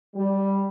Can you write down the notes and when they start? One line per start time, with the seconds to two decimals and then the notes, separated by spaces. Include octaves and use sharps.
0.15 G3